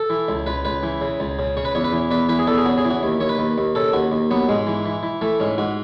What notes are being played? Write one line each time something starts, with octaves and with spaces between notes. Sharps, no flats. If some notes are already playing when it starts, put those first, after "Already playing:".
Already playing: A4
E3
C#2
C#2 B4
C#2 B4
E3
C#3
C#2
C#3
C#3 C#5
B4
E2 C#5
B4
E3
E2 B4
E3 B4
G#4
E2 A4
G#4
C#3 F#4
G#4
E3
F#4
D#2
D#2 C#5
B4
D#2
D#2
C#3 A4
D#2 F#4
D#2
F#3 B3
G#2 G#3
E3
E3
E3
E3 A3
G#2 C#4
G#2 F#4